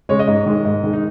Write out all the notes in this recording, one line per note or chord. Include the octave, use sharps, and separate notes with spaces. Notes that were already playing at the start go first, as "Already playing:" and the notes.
C#3 G#3 C#5
D#5
G#2
D#3 G#3
G#2
D#3 G#3
D#4